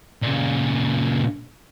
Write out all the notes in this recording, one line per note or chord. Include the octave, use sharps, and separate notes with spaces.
A#2 C#3